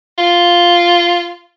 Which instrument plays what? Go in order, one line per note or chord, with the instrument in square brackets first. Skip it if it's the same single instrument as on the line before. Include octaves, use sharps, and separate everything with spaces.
[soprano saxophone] F4